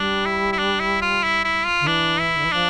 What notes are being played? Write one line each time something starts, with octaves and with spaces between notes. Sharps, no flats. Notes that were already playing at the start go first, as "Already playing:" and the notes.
Already playing: G3 D4
E4
E4
D4
E4
F4
E4
E4
F4
D3
E3 D4
E4
D3
E3
F3 D4